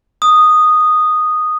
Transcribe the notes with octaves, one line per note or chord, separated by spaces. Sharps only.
D#6